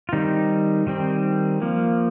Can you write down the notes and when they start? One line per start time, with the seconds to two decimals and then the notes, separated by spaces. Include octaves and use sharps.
0.09 F4
0.12 D#3 G3 C4 D#4
0.87 D#3 G3 C4
1.62 F3 A#3